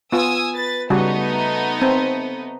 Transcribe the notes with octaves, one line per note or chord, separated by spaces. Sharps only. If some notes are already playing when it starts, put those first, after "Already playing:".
B3 F4 G#5 D#6 E6
B4 A6
C#3 G3 A3 B3 D#4 F#4
C4